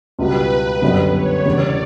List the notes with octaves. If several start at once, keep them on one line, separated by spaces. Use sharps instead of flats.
C#2 B2 G3 B4
G1 F#2 D3 G3 B3
C#5
E1 E2 C#3 G3 D5